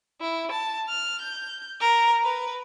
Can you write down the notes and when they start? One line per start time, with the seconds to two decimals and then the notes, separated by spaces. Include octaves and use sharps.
0.21 E4
0.51 A5
0.89 F6
1.21 G6
1.80 A#4
2.23 B4